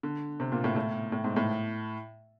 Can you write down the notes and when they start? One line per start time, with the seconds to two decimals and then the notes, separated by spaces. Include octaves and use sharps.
0.03 D3
0.40 C3
0.52 A#2
0.64 A2
0.76 A2
1.12 A2
1.24 G#2
1.36 A2